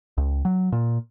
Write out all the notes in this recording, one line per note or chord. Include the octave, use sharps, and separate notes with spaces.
C#2
F#3
A#2